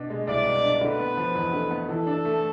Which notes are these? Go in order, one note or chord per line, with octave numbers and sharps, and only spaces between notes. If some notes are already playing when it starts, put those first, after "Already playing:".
Already playing: B2 D4
G#3
C2 D5
B2
D4
D3 B4
B3
F3
E2
D3
B3
E3 A4
D4
A3